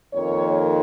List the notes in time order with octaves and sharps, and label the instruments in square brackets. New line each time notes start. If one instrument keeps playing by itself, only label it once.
[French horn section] F2 D#3 A#3 D#4 C#5